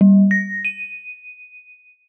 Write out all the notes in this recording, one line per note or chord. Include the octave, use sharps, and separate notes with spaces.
G3
A#6
D#7